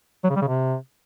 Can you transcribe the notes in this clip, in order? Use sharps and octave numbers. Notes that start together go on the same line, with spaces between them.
F#3
C#3
G3
C#3
C3